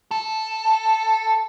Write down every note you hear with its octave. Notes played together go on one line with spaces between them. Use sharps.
A4